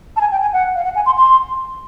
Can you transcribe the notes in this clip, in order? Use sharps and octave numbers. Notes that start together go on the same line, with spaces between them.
A5
G#5
G5
G#5
F#5
F5
F#5
G#5
C6
C6